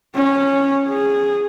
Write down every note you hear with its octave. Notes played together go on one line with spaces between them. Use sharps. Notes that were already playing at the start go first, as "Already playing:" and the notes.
C#4
G#4